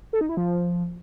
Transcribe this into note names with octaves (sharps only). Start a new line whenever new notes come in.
A4
D#4
E4
F3